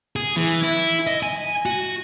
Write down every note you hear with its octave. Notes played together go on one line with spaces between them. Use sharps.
G#4
E3
E4
D#5
G#5
F#4